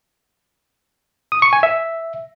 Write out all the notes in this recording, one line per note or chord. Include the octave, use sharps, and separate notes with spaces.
D#6
C#6
G#5
E5